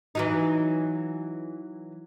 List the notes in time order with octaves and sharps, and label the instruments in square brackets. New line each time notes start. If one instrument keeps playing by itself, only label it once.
[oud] E3 F#3 D#4